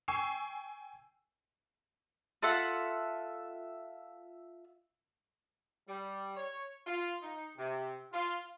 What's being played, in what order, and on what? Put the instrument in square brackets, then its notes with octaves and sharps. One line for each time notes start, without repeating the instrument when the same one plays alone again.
[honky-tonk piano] G5 G#5 C#6 E6 C7 E7
[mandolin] F4 A4 E5 F#5
[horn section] G3
C#5
F4
D#4
C3
F4